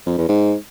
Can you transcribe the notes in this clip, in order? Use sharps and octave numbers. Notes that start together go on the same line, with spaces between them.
F2
E2
G#2